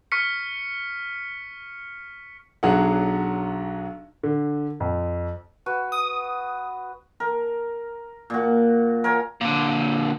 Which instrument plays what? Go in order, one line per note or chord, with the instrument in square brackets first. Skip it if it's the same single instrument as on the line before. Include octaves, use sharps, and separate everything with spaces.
[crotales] C#6 F6 B6 C#7
[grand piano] B1 F#3 D4 G#4 F#5
D3
F2
[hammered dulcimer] F#4 B4
[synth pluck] D#6
[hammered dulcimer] A#4
A#2 F#4
A#4 C#5 G#5
[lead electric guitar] A#2 D3